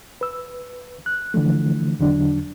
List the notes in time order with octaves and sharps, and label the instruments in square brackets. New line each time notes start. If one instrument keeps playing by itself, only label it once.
[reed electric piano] B4 E6
F#6
D3 E3 F3 A3
E2 D3 F#3 D4